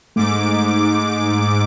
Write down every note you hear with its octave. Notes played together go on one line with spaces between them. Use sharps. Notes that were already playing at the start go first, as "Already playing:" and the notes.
G#2 A3 D6